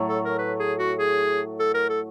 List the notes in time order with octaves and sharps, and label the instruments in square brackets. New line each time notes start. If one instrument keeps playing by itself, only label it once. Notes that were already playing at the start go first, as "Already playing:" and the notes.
Already playing: [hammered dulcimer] A2 F#3 A3
[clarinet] A4
A#4
B4
G#4
F#4
G#4
A4
A#4
A4